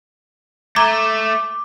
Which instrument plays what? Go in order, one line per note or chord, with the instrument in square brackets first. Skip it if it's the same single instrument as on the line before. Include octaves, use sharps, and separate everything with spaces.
[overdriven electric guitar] A3 A4 [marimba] A#5 G#6 [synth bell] D6